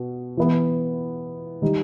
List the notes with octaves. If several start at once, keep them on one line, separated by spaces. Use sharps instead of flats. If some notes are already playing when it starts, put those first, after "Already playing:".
Already playing: B2
E3 B3 E4
D#3 G3 D#4